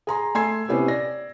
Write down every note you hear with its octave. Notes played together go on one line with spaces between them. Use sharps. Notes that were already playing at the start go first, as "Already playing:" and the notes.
G#4 A#5 C6
A3 G#5 C6 E6 G#6 C7
C3 B3 C#4 E4 G4 C5
D5 A#6